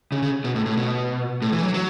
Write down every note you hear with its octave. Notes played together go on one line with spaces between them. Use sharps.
C#3
C#3
B2
A2
A2
B2
A2
E3
F#3
F#3